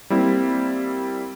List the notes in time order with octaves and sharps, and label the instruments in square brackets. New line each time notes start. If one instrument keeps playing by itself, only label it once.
[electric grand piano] G3 A#3 C4 E4